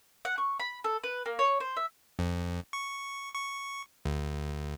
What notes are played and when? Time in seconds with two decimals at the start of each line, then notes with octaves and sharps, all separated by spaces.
0.25 F#5
0.38 C#6
0.60 B5
0.84 A4
1.03 B4
1.26 A#3
1.39 C#5
1.60 C5
1.77 E5
2.19 F2
2.73 C#6
3.35 C#6
4.05 D2